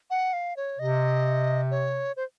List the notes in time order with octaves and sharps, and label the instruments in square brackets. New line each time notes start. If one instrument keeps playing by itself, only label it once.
[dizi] F#5
F5
C#5
[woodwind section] C3 [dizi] D#5
[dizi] C#5
C5